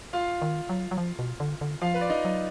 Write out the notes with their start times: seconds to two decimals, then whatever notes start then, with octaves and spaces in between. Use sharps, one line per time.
0.13 F4 F5
0.41 D#3
0.69 F#3
0.91 F#3
0.98 F3
1.19 B2
1.40 D3
1.61 D3
1.81 F3 F4 F5
1.94 B4
2.01 D5
2.09 D#4 D#5
2.25 F#3